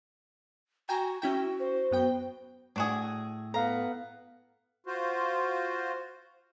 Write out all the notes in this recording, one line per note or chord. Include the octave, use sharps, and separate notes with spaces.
F#4 G5 G#5 A#5
C#4 E4 F#4 G5
C5
F#2 B3 G5
A2 D4 F#4 G#4
B3 A4 F5 A#5
F4 F#4 C5